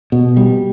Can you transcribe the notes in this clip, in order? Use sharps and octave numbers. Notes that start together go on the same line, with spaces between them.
B2
G3